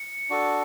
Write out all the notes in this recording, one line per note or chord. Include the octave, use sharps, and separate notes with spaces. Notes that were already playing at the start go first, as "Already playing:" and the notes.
Already playing: C#7
D4 F#4 A4